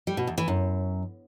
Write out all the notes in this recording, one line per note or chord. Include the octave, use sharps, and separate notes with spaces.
G3
B2
E2
E3
F#2